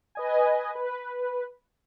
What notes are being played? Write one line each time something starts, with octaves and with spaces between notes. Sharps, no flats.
B4 D#5 G#5
B4